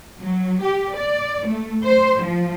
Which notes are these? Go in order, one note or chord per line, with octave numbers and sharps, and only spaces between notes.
F#3
G4
D5
A3
C5
F3